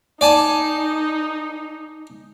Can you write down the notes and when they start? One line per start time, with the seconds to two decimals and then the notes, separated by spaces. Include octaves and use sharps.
0.21 D#4 D5 G#5 A5